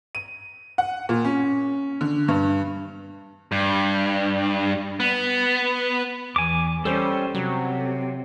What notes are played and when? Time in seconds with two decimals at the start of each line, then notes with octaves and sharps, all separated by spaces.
0.15 D#7
0.78 F#5
1.09 A#2
1.25 C#4
2.01 D3
2.28 G2
3.52 G2
5.00 B3
6.36 E2 G#5 D6
6.85 G3 C#4 A4 C5
7.35 C3 F#3